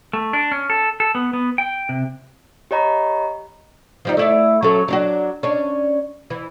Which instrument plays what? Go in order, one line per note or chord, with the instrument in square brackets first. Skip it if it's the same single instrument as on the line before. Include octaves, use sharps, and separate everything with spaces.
[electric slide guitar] A3
D4
C#4
A4
A4
B3
B3
G5
C3
[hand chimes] G4 C#5 D#5 A#5 B5
[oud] F3 G3 D#4
A3 E4 D5
F#3 C#4 A4
F#3 D4 F#4
C#4 D4
E3